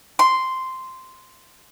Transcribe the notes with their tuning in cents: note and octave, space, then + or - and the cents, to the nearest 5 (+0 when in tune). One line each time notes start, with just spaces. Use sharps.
C6 -5